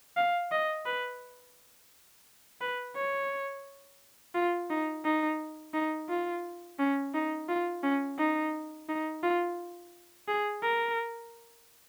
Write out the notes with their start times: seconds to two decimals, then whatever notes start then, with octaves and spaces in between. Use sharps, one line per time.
0.17 F5
0.52 D#5
0.86 B4
2.61 B4
2.96 C#5
4.35 F4
4.70 D#4
5.05 D#4
5.74 D#4
6.09 F4
6.79 C#4
7.14 D#4
7.49 F4
7.83 C#4
8.18 D#4
8.89 D#4
9.23 F4
10.28 G#4
10.62 A#4